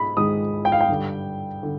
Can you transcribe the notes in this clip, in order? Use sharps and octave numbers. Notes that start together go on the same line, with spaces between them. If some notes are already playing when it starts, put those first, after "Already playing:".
Already playing: G#2 G#3 B5
G#2 D#3 G#3 D#6
G5
F5
G5
G2 D3 G3
D3